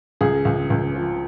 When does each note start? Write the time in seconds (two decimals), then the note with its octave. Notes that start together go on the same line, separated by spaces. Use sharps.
0.21 C#2 G#4
0.45 C#2
0.70 C#2
0.95 F3